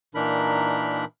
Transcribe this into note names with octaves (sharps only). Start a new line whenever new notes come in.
A#2 E3 D4 D#4 A#4 B5